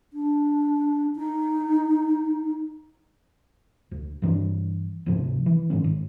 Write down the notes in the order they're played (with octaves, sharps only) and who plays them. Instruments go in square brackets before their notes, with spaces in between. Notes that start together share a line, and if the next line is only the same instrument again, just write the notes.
[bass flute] D4
D#4
[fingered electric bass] D2
G2 E3 D4
D2 G#2 C3 F3
E3
G#2 D#3 C#4
G#1